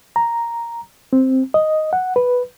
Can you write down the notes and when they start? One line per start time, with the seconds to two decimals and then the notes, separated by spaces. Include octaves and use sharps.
0.16 A#5
1.13 C4
1.54 D#5
1.93 F#5
2.16 B4